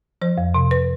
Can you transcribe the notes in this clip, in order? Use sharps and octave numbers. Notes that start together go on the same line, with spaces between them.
F3 C5
F2
C3
B4